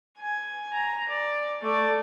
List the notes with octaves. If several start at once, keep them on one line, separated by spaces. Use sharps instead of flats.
G#5
A#5
D5
A3 D5